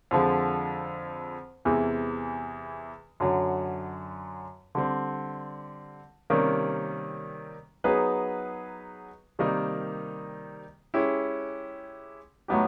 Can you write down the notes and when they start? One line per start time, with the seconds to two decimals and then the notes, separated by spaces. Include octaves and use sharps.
0.11 F2 D3 F3 G#3
1.65 E2 C3 E3 G#3
3.20 F#2 D3 F#3
4.75 D3 G3 C4
6.30 C3 D#3 G3 A#3 C#4
7.84 F#3 B3 D#4 G#4 B4
9.39 C3 D#3 G3 A#3 D#4
10.94 G#3 C#4 E4 G4
12.48 A2 F#3 B3 D#4 G4